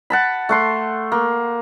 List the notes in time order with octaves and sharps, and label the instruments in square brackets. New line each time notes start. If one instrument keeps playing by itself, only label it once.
[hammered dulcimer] F#5 A5 B5
A3 F#5 C6
A#3